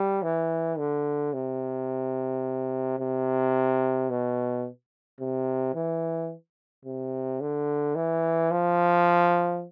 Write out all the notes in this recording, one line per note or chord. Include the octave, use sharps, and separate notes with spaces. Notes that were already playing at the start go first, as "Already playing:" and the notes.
Already playing: G3
E3
D3
C3
C3
B2
C3
E3
C3
D3
E3
F3